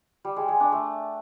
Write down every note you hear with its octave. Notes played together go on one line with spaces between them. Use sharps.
G3
G#3
G#3
D4
A3